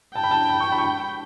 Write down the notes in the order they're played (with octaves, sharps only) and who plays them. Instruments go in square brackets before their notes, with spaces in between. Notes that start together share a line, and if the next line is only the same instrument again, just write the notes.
[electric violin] G5 [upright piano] A5
[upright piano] B5
A5
B5
C#6
B5
C#6
B5